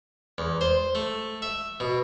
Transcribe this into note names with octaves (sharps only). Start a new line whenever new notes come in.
E2
C5
A3
E5
B2